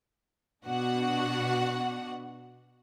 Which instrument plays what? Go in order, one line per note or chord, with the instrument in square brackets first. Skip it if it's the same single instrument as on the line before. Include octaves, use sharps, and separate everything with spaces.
[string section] B2 D4 F#4 F#5